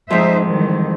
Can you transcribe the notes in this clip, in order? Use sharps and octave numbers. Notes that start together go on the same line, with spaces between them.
F2 G#2 D#4 C5 E5
D#3 E3 G3